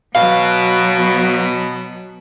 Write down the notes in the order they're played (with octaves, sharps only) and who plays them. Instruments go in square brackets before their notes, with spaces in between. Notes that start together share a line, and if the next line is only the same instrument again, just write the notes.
[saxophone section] B2 [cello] F#3 B3 [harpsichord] F5